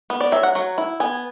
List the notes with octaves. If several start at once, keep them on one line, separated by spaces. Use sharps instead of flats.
B3
D5
F#3 E5
F#5
F#3 F#5
E4
B3 G#5